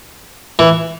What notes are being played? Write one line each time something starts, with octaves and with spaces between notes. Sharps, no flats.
E3